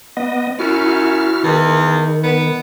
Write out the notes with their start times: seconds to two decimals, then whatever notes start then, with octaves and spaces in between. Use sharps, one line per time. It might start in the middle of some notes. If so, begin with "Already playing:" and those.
0.17 B3 D#5
0.59 F#2 E4 F#4 F6
1.43 E2 D#3
2.23 B3